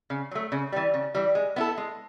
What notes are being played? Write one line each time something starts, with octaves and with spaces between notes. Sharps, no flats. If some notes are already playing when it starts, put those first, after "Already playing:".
C#3
F#3 A3
C#3
E3 G3
C#3
E3 G3
G#3
B3 E4 A4
G#3